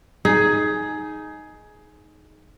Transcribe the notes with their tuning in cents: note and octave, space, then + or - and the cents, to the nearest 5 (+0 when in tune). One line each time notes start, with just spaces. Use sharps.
D#4 +0 G#4 +15